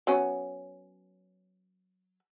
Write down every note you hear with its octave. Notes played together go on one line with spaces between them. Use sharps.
F#3 B3 C#4